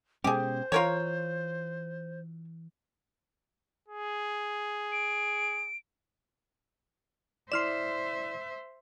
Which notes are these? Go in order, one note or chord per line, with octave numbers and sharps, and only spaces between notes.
B2 G#3 C#4 G4 G#4 C5
E3 F4 A#4 C#5
G#4
D7
E4 C5 D5 E5 C6 F6 E7